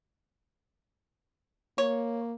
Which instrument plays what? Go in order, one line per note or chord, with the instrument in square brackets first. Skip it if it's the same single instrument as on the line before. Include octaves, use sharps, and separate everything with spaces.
[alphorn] A#3 [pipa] C#5